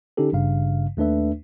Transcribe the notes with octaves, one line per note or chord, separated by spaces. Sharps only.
D3 C#4 D#4 G4 A4
G#1 G2 C#3 F5
D#2 A3 D4 B4 E5